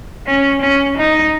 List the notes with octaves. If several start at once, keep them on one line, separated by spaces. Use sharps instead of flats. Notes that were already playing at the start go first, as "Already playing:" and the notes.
C#4
C#4
D#4